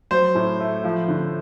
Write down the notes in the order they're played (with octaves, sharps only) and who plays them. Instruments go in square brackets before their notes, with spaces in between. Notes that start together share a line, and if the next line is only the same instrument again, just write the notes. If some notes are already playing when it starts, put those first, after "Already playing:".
[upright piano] F#3 C5
A2
A3
F3
D3